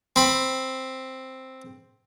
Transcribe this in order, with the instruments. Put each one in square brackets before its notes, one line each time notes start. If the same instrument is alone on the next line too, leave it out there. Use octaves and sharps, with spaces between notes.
[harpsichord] C4 B5